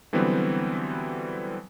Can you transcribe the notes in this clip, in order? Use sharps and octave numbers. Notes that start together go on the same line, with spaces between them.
D3 E3 F#3 G3 B3 C4